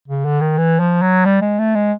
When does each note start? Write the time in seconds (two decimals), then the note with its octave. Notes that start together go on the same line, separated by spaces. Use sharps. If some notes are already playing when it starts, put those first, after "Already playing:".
0.08 C#3
0.25 D3
0.41 D#3
0.58 E3
0.80 F3
1.02 F#3
1.25 G3
1.41 G#3
1.59 A3
1.75 G#3